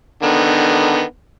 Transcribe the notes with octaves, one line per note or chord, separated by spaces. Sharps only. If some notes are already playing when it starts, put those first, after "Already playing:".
D3 D#3 B3